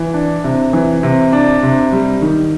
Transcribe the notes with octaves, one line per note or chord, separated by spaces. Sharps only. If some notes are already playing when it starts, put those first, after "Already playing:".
Already playing: E3
D4
C3
E3
C3
D4
C3
G3
D#3